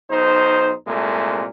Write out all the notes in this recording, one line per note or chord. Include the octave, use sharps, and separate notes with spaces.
B1 D#4 C5
C2 A#2 G#3 A3